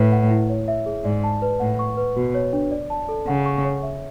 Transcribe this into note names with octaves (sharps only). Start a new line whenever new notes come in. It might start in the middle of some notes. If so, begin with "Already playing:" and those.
Already playing: A2 B4
F#5
E4
C#5
E5
G#4
G#2 D5
A5
B4
A2 F#5
C#6
B4
B2 F#4
C#5
D4
D5
A5
A4
C#3 F#5
C#6
C#5
E5